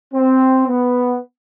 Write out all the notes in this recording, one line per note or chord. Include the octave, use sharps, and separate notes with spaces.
C4
B3